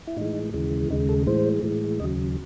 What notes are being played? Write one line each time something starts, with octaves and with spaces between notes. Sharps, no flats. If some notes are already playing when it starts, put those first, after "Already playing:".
E4
A2 E3 G#3 D#4
D#2 C#3 E3 G#3
D#2 C#3 G#3 D#4
A4
A2 E3 G#3 C5
A2 E3 G#3
D#2 C#3 F#3 D#5